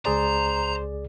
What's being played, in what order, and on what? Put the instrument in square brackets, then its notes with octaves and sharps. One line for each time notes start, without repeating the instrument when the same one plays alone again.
[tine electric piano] C#2 G#4 D5 [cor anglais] C5 [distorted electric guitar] A#5